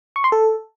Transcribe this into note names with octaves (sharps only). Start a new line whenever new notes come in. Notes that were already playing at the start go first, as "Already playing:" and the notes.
C#6
C6
A4